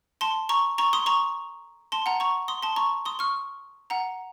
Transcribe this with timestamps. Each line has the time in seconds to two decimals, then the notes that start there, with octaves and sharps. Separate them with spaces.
0.21 A5 C6
0.49 A#5 C#6
0.78 A#5 C#6
0.93 C6 D#6
1.06 A#5 C#6
1.92 A5 C6
2.06 F#5 A#5
2.20 A#5 C#6
2.48 C6 D#6
2.63 A5 C6
2.76 A#5 C#6
3.05 C6 D#6
3.19 C#6 F6
3.90 F#5 A#5